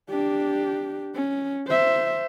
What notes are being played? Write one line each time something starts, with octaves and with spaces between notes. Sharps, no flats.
D4 G4
C#4
C5 E5